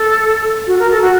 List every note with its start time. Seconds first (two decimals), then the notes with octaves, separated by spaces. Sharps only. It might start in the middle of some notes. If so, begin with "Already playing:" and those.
Already playing: A4
0.67 F#4
0.79 A#4
0.90 A4
1.02 F#4